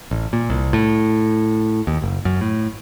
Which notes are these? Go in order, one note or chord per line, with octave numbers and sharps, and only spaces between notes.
A1
A#2
C2
A2
D#2
F#1
F#2
A2